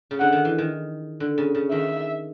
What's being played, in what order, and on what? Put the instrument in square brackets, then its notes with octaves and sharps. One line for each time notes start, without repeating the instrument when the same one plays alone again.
[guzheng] C#3
[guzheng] D3 [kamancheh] F#5
[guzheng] D#3
E3
D#3
D3
C#3
C#3
[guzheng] D#3 [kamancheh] E5